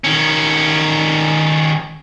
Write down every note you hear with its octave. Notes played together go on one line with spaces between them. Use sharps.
D#3 C#4